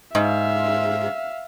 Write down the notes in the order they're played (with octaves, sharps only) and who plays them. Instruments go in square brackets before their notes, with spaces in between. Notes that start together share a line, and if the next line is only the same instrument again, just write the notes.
[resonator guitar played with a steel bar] G#2 [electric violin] E5 F5